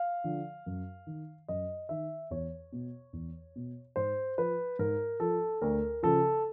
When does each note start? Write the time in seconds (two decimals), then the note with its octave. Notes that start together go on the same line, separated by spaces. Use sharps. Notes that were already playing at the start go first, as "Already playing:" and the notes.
Already playing: F5
0.24 D3 F3
0.66 F#2
1.07 D#3
1.48 F#2 D#5
1.89 D#3 E5
2.31 E2 C#5
2.72 B2
3.13 E2
3.56 B2
3.96 G#2 C5
4.38 F3 B4
4.79 G#2 A#4
5.20 F3 A4
5.62 D2 A#4
6.03 C#3 F3 A4